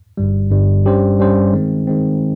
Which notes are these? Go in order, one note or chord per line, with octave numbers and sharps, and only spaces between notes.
G1 G2 G3
G1 G2 G3
G2 G3 C#4 G4 C5
G2 G3 C#4 G4 C5
D#3 G#3 C4
D#3 G#3 C4